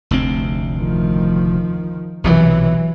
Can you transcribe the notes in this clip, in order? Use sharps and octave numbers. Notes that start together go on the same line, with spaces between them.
F1 D2 C4
D#3 F3
B1 C3 E3 F#3